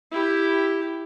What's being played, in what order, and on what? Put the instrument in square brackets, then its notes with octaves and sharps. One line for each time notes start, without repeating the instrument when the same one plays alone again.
[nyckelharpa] E4 G4